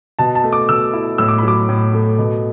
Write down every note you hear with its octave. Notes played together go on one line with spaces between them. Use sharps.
B2 A5
A5
A3
D6
B2 E6
E4
A2 E6
D6
B5
F#3 D6
A2
A3
B2